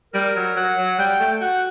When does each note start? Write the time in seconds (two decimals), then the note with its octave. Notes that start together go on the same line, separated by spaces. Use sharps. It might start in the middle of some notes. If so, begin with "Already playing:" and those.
0.14 G3 A#4
0.36 F#3
0.56 F#3 F#5
0.78 F#3
0.99 G3 G5
1.20 A3
1.33 G5
1.41 F#4 F#5